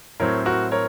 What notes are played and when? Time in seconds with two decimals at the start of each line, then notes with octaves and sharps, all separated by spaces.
0.20 A2 F#3 C4 A#4 C#5
0.45 F#4 A#4
0.72 A#4 C#5